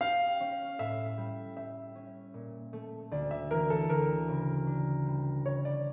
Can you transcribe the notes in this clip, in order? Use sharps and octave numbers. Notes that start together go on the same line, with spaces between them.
G4 F5
C#4
A2 E5
G3
G4 E5
C#4
A#2
A3
D2 D5
E5
E3 A#4
A4
D2 A#4
C#3
D4
G3
C#3 C#5
D5